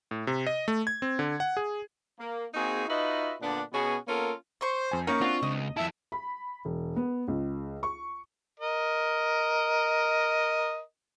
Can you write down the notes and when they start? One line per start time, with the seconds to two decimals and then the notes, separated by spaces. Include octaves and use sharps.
0.11 A2
0.27 C3
0.47 D#5
0.68 A3
0.87 G#6
1.02 C4
1.19 D3
1.40 F#5
1.57 G#4
2.19 A#3
2.54 A#3 C4 D#4 F#4 G#4
2.89 D#4 F4 F#4 B4 D#5 E5
3.41 A#2 D3 B3 D4
3.73 B2 B3 C#4 F#4 G#4
4.07 A#3 B3 C#4 F4 A4 A#4
4.61 C5 C6 C#6
4.91 F2 G#5
5.07 A#3 C#4 D#4 E4 F#4 A#4 C#6
5.21 C4 D4 F4 F#4
5.42 C#2 D#5
5.77 F2 E4 E5 A5
6.12 B5
6.65 E1
6.96 B3
7.28 C#2
7.83 C#6
8.60 A#4 D#5